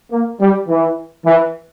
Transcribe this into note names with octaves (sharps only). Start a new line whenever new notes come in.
A#3
G3
E3
E3